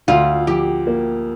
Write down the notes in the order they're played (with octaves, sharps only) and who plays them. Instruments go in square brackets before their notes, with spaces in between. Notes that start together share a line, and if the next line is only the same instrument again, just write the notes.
[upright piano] D2 [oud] F4
[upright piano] F3 [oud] G4
[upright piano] A#3